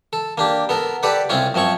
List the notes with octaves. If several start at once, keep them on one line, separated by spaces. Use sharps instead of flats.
A4
A#3 D4 G4
B3 A4 A#4
G4 A4 B4 D5 F#5
C2 C4 C#4 F4 C#5
F#2 F3 C4 C#5 C#6